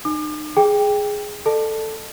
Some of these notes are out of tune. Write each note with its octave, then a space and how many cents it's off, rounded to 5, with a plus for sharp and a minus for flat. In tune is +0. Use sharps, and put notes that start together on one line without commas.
D#4 -35 D6 +40
G#4 +0 G5 +10
A4 +5 D#5 -45 A5 +0